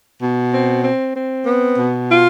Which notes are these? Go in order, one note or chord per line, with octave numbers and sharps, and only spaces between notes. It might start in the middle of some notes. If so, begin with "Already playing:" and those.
B2
C4
C4
C4
B3
B2
F4